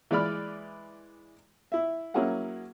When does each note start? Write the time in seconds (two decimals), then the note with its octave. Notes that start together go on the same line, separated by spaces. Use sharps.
0.11 E3 G#3 D5 B5 F6
1.72 E4 E5
2.14 F#3 A#3 C#4 E4 G#4 F#5